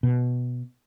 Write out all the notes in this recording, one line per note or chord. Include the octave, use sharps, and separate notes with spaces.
B2